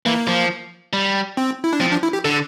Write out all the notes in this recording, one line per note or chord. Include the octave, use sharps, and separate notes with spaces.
E3 A#3
F3
G3
C4
E4
D4
F3 C4
D4
E4
G4
D3 A4